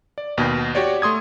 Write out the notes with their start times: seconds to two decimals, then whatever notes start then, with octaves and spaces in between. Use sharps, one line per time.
0.18 D5
0.37 D#2 B2
0.75 F#4 G4 C#5 D5
1.02 A3 C6 D#6 G#6